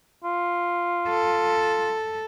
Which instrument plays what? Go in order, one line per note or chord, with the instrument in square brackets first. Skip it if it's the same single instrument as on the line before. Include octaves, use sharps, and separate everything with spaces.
[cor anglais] F4
[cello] A4